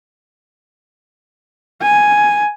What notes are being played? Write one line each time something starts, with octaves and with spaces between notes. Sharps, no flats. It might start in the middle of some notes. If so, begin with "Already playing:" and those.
G#5